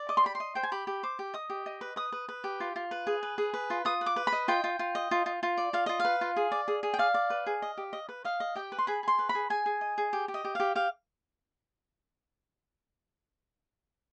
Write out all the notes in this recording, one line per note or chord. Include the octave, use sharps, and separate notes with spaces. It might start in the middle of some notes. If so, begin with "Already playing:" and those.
Already playing: D5
D#5 D6
C6
G4 B5
C6
D#5
C5 G5
G#5
G4 B5
G4
C5 D6
G4
D#5 D#6
G4
D#5
B4
B4 D#6
B4
B4
G4
F4
F4
B4
G#4
B4
G#4
B4
F4
F4 D#6
B4
D6
B4
B5
D#5
F4 G5
F4
F4
D#5
F4
F4
F4
D5
F4 F5
F4 D#5
F5
B4
F4
G#4
D5
G#4
G#4
G5
D5 F5
D5
B4
G#4
D#5
G4
D#5
B4
D#5 F5
D#5
G4 G5
B4
C6
G#4 B5
G#4 C6
B4
B5
G#4
G#4 G#5
G#4
D#5
G#4
G4
G4
D#5
G4
G4 F5
G4 F5